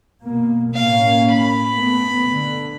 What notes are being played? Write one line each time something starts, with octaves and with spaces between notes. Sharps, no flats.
B2 A#3
A2 A#3 C#4 F5
B5
A3 B3
D3